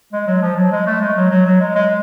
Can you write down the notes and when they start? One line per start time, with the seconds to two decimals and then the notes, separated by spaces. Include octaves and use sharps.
0.13 G#3
0.27 F#3
0.42 F3
0.57 F#3
0.72 G#3
0.86 A3
1.01 G#3
1.16 F#3
1.31 F#3
1.46 F#3
1.60 G#3
1.75 G#3